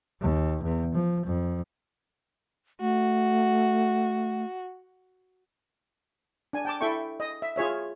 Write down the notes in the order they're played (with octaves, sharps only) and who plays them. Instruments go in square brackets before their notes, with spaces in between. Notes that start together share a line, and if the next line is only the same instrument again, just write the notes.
[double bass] D#2
E2
F3
F2
[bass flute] A3 [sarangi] F#4
[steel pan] D4 G#5
G5 A5 D6
E4 A4 E5 G5 C#6
D#5
E5
F4 G#4 C#5 E5